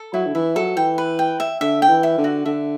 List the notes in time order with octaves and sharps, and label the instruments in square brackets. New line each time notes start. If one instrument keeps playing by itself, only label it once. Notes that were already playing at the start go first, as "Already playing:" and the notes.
Already playing: [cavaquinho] A4
[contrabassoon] F#3 [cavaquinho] E4
[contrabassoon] D3
[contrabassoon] E3 [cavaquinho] E5
[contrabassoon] F#3 [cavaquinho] A4
[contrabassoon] E3 [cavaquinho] G5
[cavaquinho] B4
G5
E5
[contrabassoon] D3 [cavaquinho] E5
[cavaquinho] G5
[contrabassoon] E3
[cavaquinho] E5
[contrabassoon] D3
[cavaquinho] F#4
[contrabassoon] D3 [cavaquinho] E5